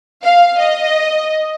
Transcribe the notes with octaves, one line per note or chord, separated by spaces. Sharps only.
F5
D#5